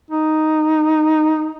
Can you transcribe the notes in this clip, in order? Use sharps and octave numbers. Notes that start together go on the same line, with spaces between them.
D#4